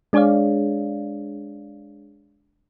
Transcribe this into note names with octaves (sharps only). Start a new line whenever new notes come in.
G#3 D4 G#4 C#5 D5 F5